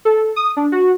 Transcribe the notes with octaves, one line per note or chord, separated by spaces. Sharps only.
A4
D#6
D4
F#4